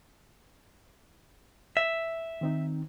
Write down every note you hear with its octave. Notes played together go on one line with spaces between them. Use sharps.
E5
D#3 C4 D#4